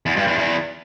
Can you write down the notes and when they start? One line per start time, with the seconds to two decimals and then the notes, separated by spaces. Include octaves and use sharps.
0.06 E2
0.17 G2
0.27 E2
0.38 E2